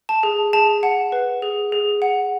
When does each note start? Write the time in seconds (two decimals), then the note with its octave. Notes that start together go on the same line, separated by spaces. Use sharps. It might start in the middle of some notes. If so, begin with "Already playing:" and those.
0.09 A5
0.23 G#4
0.53 G#4 A5
0.83 F#5
1.12 B4
1.42 G#4
1.72 G#4
2.02 F#5